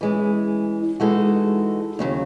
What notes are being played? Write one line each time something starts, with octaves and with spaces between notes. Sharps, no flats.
E3 G#3 C#4
E3 G#3 D#4 F#4 A4
D#2 C#3 F#3